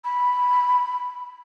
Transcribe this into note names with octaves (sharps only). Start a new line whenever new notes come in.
B5